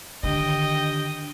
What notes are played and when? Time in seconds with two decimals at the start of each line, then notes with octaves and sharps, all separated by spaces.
0.23 D3 D#3 D4 G4 D#5 G5